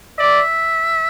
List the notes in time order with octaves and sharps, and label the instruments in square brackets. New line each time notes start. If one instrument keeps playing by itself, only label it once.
[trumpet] D5 [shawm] E5